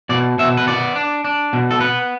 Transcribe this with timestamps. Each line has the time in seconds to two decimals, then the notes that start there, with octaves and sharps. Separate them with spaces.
0.09 B2 D5
0.38 B2 E5
0.57 B4
0.67 B3 D5
0.96 D4
1.24 D4
1.53 B2
1.71 A4
1.80 B3 B4